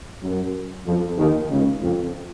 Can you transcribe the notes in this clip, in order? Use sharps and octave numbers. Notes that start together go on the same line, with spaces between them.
F#2 F#3
F2 F3
D#2 D#3
C#2 C#3
F2